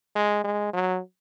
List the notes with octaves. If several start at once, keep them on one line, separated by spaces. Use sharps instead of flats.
G#3
G#3
F#3